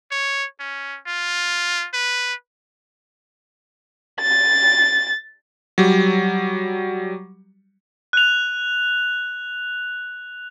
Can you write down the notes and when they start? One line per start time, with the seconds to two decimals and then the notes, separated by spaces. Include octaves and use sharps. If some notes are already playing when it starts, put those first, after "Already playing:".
0.11 C#5
0.60 C#4
1.07 F4
1.93 B4
4.21 A6
5.78 F#3 G3
8.13 F#6 F7